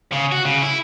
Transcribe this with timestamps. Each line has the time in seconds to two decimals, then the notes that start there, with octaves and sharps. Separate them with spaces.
0.12 C#3
0.32 F#4
0.45 C#3
0.62 E4